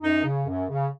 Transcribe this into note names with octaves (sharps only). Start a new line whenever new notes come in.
F#2 D#4
C#3
F#2
C#3